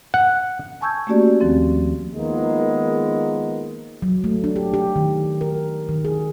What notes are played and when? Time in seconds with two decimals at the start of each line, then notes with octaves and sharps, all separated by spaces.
0.14 F#5
0.81 G#5 A5 C#6 E6 G6 G#6
1.07 A3 A#3 C#4 F#4 G4 D5
1.41 D#2 D#3 F3 C4
2.16 D#3 F3 G#3 A#3 B3
4.02 F#3
4.24 A3
4.44 D4
4.56 G4
4.74 G4
4.96 D#3
5.41 A#4
5.89 D#3
6.05 G#4